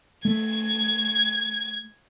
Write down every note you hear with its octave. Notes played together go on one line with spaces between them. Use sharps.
A3 G#6